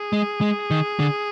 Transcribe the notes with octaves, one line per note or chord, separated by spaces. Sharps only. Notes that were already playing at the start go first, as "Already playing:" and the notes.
Already playing: G#4
G#3
G#3
D#3
D3